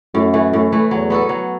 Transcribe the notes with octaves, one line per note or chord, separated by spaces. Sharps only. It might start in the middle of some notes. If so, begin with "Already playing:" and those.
F#2 A2
E3 A3
A2
E3 A3
E2 F#3
B3 F#4 A4
F#3